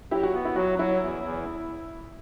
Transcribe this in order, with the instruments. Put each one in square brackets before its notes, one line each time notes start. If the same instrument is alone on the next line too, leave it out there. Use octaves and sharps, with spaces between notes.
[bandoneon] F#3 [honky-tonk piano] E4 G4
[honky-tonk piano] F#4
[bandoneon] B3 [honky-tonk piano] F#4
[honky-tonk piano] E4
[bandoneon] F#3 [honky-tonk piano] F#4
[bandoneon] F#3 [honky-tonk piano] E4
[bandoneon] E2
E2